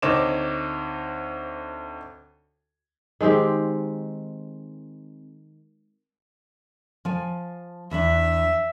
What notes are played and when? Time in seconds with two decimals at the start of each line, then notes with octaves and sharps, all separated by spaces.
0.02 D2 C4 D#4 C#5 D6 E7
3.21 D#3 G#3 C4 G4
7.05 F3 G#5
7.91 E2 E3 D4 E5